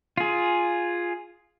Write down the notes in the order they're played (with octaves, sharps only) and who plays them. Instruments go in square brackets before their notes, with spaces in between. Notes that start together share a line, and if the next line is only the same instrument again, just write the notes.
[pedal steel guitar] F4 G#4